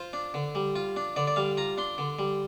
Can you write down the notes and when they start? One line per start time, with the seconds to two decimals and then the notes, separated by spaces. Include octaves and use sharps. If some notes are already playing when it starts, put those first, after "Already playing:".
Already playing: F4 C5
0.13 D4
0.34 D3
0.55 G3
0.76 F4
0.96 D4
1.16 D3 D5
1.27 D5
1.36 G3 F5
1.57 F4 A#5
1.78 D4 C6
1.98 D3
2.19 G3